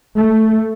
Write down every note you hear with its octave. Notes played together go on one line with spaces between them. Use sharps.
A3